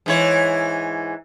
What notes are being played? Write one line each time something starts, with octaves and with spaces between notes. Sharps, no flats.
G#2 E3 C#5